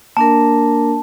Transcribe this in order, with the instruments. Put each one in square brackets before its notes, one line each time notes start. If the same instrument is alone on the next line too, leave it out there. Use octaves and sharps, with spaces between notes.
[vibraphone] A#3 D4 A#4 [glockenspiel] A5